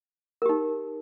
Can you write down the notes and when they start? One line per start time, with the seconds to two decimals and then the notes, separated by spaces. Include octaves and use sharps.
0.42 A#4
0.46 G4
0.49 D#4